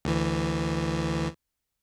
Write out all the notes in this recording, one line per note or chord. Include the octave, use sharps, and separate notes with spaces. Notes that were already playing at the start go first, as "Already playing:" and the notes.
D2 E3